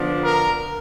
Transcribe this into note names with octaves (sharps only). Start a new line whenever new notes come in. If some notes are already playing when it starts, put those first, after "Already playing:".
Already playing: D3 F3 B3 D4
A#4